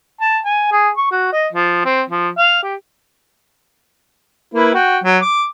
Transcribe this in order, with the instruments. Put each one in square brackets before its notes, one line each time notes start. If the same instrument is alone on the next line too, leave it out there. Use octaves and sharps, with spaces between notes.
[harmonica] A5
G#5
G#4
C#6
F#4
D#5
F3
C4
F3
F5
G4
A#3 E4 B4
F#4 G5
F#3
D6